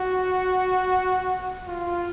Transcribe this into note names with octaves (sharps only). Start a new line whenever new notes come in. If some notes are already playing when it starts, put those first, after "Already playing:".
Already playing: F#4
F4